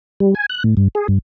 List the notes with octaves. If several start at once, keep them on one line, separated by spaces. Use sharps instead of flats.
G3
G#5
F#6
A2
G2
G#4
G2